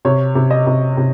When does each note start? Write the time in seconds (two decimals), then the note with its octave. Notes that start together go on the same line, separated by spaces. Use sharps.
0.05 C3 C#5
0.35 C3
0.51 D#5
0.67 C3
0.97 C3